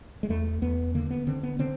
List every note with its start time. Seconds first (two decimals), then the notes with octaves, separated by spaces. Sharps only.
0.23 G#3
0.29 E2 A3
0.62 E2 B3
0.95 D3 A#3
1.11 B3
1.27 D3 C4
1.43 B3
1.59 D3 C4